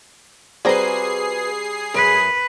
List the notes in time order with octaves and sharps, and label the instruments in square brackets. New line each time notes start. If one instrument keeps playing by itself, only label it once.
[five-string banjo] G3 C4 A#5 [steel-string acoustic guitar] F#4 B4 [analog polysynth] G#4 C7
[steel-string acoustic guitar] F#2 [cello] B4